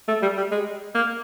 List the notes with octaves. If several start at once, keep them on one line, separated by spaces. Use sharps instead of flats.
A3
G3
G3
G#3
A#3